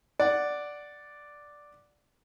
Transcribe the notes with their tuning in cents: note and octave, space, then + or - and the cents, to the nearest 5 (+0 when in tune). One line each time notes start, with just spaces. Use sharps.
D5 +0 F#5 +0